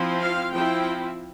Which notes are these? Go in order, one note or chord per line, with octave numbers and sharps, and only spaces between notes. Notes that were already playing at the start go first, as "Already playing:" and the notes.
Already playing: F3 C4 E4
F5
F3 C4 E4 G5